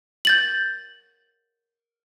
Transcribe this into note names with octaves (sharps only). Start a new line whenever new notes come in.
G6 A6 F#7